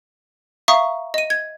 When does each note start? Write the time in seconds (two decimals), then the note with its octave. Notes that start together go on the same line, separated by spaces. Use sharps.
0.68 E5 F5 A#5 C#6 D#6
1.14 D#5 D#7
1.30 G#6